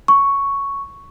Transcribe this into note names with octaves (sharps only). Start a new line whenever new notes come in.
C#6